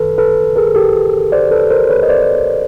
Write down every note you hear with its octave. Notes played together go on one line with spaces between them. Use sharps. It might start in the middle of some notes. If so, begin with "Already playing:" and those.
Already playing: F#2 D#3 A4 B4
A4 B4
G#4 A#4
G4 A4
C5 D5
A4 B4
A#4 C5
B4 C#5
D#5
C5 D5